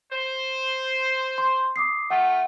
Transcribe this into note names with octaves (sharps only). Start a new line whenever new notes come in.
C5
C6
D6 D#6 C7
A3 F4 F#5